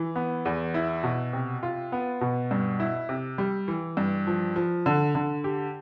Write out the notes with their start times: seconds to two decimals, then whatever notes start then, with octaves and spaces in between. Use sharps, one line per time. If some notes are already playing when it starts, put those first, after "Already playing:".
Already playing: E3
0.16 B3
0.45 E2
0.74 E4
1.04 B2
1.33 C3
1.63 F4
1.92 B3
2.21 B2
2.51 G2
2.80 E4
3.09 C3
3.38 G3
3.68 E3
3.97 G2
4.27 F3
4.56 F3
4.86 D3
5.15 D3
5.44 G4